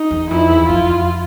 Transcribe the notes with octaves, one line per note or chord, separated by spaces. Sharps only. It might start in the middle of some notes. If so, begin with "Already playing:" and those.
Already playing: D#4
E2
F2 E4
E2
F2 F4